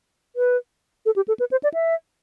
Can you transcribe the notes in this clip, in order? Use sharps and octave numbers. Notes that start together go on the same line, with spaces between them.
B4
A4
G4
A4
B4
C5
D5
E5